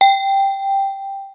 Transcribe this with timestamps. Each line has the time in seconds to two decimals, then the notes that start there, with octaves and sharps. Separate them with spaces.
0.01 G5